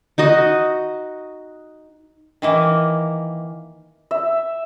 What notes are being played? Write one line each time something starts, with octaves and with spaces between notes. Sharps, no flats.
D#4 F#4 D#5
D#3 E3 A#3
E5